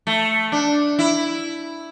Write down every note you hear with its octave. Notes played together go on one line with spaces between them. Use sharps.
A3
D4
E4